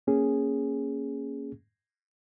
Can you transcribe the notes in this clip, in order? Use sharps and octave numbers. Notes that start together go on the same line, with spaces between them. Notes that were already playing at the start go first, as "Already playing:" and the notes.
A#3 C#4 G#4